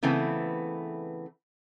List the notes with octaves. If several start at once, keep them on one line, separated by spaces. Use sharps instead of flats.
C#3 E3 A3 B3 C4